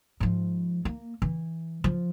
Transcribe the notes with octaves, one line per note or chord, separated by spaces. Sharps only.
G#2 F3
A#3
E3
F3